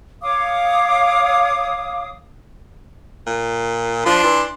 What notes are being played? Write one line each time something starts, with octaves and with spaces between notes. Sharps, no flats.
C#5 F5 D6 D#6
A#2
F3 D4 C6
E3